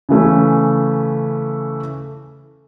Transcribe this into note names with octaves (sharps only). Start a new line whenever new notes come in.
C#3 E3 A3 C#4